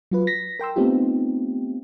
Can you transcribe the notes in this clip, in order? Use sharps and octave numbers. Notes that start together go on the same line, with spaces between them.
F#3 F4 B4
A#6 B6
A#4 G5 C6 E6
A3 B3 C4 D#4 F4 G4